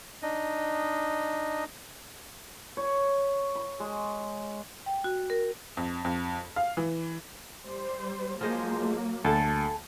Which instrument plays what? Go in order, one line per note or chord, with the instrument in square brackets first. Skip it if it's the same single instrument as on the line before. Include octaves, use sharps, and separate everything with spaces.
[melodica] D4 D#4 D#5
[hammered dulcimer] C#5
B5
G#3
[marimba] G5
F#4
A#4
[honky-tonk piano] F2
F2
F5
E3
[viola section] G3 C5
[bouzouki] F3 G#3 C5 [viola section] F#3 A#3
[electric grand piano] D2 [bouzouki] A4 A5